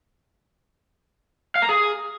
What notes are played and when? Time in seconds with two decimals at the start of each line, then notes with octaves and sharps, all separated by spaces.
1.56 F5
1.62 A#5
1.69 G#4